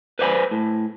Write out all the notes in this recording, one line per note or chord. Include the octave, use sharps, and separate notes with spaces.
B4 C5 D5 E5 G#5 B5
A2